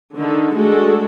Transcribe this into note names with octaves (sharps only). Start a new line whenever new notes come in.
D3 D#3 A4
G#3 A3 D4 F#4 A4